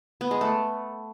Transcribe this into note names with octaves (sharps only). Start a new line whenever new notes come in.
B3
G#3
A3